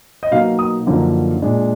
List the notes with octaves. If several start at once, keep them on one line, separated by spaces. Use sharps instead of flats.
D#5
B2 F#3 A#3 D#4 F5
D#6
F#2 D3 F3 A#3 D#4
A#2 G#3 D4